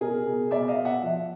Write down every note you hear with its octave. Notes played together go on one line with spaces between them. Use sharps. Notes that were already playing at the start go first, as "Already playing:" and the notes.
B2 G#4 A#4
B2
B2 D5 E5
D#5 F5
B2
E5 F#5
F3